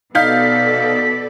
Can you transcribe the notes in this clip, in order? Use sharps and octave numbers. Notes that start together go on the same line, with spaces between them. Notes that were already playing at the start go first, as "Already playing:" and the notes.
B2 D#4 A4 D5 F5 G6 B6